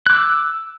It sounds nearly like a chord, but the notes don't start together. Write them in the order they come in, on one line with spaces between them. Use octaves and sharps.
F#6 D6 E6